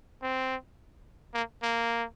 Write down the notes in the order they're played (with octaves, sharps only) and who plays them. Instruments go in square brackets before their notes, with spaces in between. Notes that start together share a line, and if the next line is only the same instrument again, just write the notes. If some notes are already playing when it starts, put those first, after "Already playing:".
[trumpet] C4
A#3
A#3